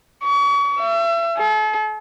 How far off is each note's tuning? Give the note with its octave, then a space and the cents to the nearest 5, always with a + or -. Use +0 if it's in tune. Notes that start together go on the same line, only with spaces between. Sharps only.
C#6 +35
E5 +35
A4 -40